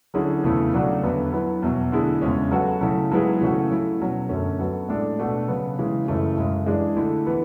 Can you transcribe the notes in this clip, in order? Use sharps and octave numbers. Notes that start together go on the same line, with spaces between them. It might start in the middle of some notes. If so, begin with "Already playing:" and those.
D3 F#3 C#4 E4 G#4
E2 C#3 E3 A3 E4
C#3 F#3 A3 D4 F#4
E2 D3 F#3 B3
F#3 B3 E4
E2 B2 F#3
D3 A3 E4 G#4
E2 C#3 G#3 C#4
F#3 B3 F#4 A4
C#3 F#3 A3 E4 A4
G#2 F#3 B3 E4 G#4
C#3 E3 A3 C#4 F#4
F#3 A3 E4
B2 F#3 C#4
F#2 D3 A3 C#4
F#3 B3 F#4 A4
A2 G#3 D4 A4
B2 A3 D4 F#4
C#3 F#3 B3
C#3 E3 G#3
F#2 C#3 E3 A3
F#2 C#3 G#3
E3 G#3 D4 G#4
D3 A3 E4
E3 B3